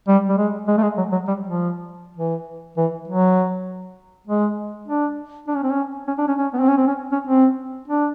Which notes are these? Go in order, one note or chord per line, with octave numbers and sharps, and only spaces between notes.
G3
G3
G#3
G#3
A3
G#3
F#3
F#3
G3
F3
E3
E3
F#3
G#3
D4
D4
C#4
C4
C#4
C#4
D4
C#4
C#4
B3
C4
C#4
C4
C#4
C#4
C4
D4